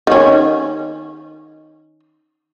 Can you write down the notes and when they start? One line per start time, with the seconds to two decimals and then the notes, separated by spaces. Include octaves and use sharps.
0.07 D#3 C#4